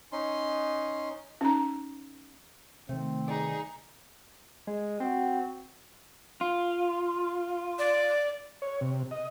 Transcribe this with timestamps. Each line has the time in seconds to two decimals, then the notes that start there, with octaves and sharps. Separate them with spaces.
0.12 C#4 D#4 C6
1.41 C#4 D#4 A#5
2.89 C3 D#3 A3 C4
3.28 G2 D#4 G#4 D5
4.67 G#3
5.00 C4 F#4
6.41 F4
7.79 D5
8.62 C#5
8.81 C3
9.11 D#5